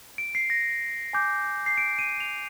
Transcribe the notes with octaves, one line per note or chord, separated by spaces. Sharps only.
D7
C7
A#6
G#5 D6 G6
C7
D7
D#7
F7